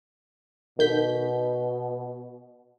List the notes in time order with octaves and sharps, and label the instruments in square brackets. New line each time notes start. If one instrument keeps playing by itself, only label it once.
[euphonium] B2 [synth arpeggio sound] D#3 G6 B6